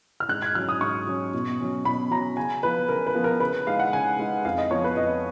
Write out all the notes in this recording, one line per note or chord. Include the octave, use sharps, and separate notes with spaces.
F6
G#2 F#6
G#6
F#3 C#4 F6
D#6
G#2 C#6
F#3 C#4
B2
F#3 C#4
B2 B5
F#3 C#4 A#5
C#3 G#5
F3 B3 B4
C#3 A#4
B4
F3 B3
A#4
C#3 B4
G#3 D#4 F5
F#5
C#3 G#5
G#3 D#4
F2 F5
D#5
F3 B3 C#5
B4
F2 D#5